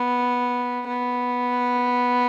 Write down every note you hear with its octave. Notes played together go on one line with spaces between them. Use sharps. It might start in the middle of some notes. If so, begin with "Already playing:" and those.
Already playing: B3
B3